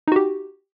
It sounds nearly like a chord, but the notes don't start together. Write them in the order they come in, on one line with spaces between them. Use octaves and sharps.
D#4 F#4 G4